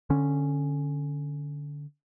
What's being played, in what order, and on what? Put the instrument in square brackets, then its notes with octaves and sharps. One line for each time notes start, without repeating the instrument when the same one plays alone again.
[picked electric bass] D3 C#4